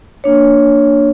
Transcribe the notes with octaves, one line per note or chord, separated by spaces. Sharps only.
A#3 D4 C#5